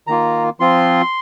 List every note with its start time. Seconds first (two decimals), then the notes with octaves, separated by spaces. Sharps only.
0.07 D#3 A#3 F4 A#5
0.60 F3 C4 F4 C6